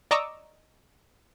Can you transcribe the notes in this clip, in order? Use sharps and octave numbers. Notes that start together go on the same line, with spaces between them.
D5 D#5 A#5 C#6 D6 E6